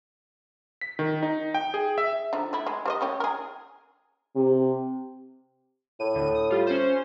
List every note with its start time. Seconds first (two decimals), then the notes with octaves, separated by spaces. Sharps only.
0.81 B6
0.99 D#3
1.23 D#4
1.54 G5
1.74 G#4
1.98 E5
2.33 D3 F3 D#4
2.53 A3 E4
2.67 G#3
2.86 G3 C5 D#5
3.01 A#3 C#4 G4
3.20 G#4 A#4
4.36 C3
6.00 A2 D#7
6.15 D2 D#7
6.35 D#6
6.50 G3 F4
6.67 C#4 C5